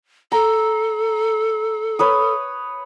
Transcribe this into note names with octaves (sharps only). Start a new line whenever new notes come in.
A4 A#5
B4 C#5 D#6